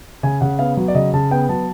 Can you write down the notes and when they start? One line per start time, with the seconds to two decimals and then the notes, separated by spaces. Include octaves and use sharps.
0.23 C#3 G#5
0.41 C#3 F#5
0.59 B3 F5
0.77 F#3
0.88 D5
0.95 C#3 D#5
1.13 C#3 A5
1.31 B3 G5
1.49 F#3 A5